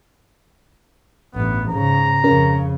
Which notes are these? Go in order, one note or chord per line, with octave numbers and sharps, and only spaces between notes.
A1 G2 B3
G#2 C#3 A#5
F2 C#3 C#4 A#4